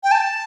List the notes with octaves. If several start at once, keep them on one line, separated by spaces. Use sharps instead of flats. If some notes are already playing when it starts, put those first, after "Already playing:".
G5
A5